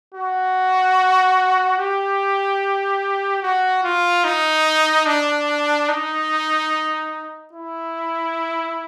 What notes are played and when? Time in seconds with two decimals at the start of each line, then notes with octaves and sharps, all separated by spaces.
0.14 F#4
1.78 G4
3.43 F#4
3.84 F4
4.24 D#4
5.06 D4
5.89 D#4
7.53 E4